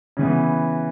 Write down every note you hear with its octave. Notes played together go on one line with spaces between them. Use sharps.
C#3 E3 B3